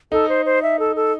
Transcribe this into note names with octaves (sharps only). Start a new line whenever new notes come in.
D#4 A4
C5
C5
E5
A4
A4